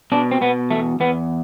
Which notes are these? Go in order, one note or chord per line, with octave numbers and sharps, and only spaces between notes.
B2 D4
C4
B2 B3
E2 A3
E2 B3